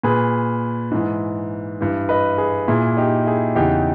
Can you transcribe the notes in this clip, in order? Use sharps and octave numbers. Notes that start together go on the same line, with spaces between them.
A#2 G#4 B4
G#2 E3
G2 E3
B4 D#5
G#4 B4
A#2 E4 G#4
D#4 G4
E4 G#4
E2 C#3 E3 D#4 G4